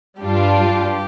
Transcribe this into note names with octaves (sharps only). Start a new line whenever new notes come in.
G2 G3 D4 F4 G4